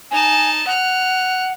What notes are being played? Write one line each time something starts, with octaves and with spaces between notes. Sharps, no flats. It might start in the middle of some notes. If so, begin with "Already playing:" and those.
D#4 G#5 A5
F#5 F6 F#6